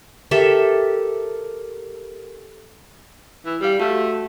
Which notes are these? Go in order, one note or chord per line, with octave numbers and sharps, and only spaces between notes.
G4 A4 A#4 E5
E3
G3 G4 F5
A3 F#4